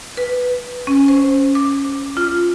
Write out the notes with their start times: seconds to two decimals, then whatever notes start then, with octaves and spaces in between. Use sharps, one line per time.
0.17 B4
0.87 C#4
1.08 C5
1.55 D6
2.17 F4